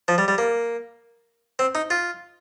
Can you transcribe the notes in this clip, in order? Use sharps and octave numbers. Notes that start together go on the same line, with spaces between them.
F3
G3
G3
A#3
C4
D#4
F4